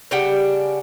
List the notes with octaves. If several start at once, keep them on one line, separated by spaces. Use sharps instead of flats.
C#3 D4 G4 F#5